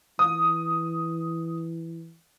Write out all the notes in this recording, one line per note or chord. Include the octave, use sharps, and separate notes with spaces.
E3 D#6